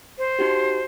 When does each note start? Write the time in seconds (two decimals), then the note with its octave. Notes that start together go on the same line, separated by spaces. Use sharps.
0.18 C5
0.39 D#4 F#4 G4